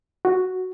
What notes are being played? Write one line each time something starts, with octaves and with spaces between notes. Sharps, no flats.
F#4